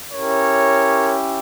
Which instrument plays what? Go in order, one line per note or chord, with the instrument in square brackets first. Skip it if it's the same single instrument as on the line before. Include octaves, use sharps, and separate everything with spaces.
[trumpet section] C#4 E4 G4 A#4 C#5